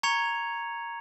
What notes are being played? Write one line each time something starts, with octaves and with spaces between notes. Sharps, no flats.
A#5 C#6 G#6 C#7 F7